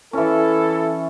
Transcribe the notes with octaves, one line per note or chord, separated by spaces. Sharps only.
E3 C#4 E4 A4